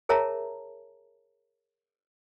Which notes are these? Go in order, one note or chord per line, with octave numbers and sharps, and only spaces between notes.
G#4 A#4 C#5 E5 A5 A#5